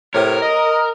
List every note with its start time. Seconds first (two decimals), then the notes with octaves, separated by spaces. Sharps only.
0.15 A2 C3 A#4 C#5
0.42 D#5